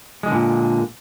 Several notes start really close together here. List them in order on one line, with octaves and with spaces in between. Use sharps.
G#3 D3 A#2